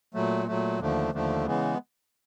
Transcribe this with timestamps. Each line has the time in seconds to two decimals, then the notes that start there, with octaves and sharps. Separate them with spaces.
0.14 A#2 F#3 A3
0.47 A#2 F#3 A3
0.79 D#2 D3 F3 A3
1.13 D#2 D3 F3 A3
1.46 C#3 E3 G#3 B3